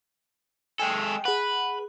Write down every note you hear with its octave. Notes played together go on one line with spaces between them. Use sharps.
G#3 A4 G5 G#5
G#4 B4 F#5